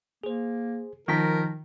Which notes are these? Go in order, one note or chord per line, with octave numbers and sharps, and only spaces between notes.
A#3 G#4 C5
D#3 F3 F4 A#4 A5 B6